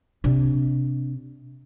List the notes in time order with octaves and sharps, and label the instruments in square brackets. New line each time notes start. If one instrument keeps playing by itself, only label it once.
[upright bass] C3 D4